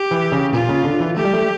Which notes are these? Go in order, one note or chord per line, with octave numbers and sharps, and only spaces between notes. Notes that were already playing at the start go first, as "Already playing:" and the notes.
Already playing: G4
E3
C#3
A#2 F4
C#3
D3
E3
A3 G4
G3
A3